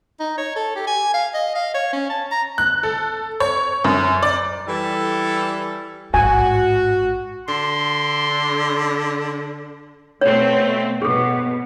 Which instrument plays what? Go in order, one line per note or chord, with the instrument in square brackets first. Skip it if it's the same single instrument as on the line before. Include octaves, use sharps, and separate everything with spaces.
[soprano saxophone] D#4
C#5
A4
G4
G#5
F5
D#5
F5
C#5
C#4
A5
A#5
[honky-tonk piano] F#6
A4
C#5
F#2
D5
[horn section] E3 G3 A4
[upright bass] A1 G#2 [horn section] F#4 [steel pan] G#5
[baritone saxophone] D3 [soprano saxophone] C6
[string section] B2 A3 C4 [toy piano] C#5
[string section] B2 [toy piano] G#4 A4